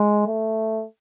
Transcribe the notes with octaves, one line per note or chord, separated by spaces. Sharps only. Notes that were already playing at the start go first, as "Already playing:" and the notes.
Already playing: G#3
A3